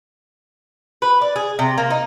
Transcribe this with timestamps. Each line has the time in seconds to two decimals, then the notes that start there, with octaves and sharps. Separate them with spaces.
1.02 B4
1.21 D5
1.36 G#4
1.59 C3
1.78 A#3
1.90 D#4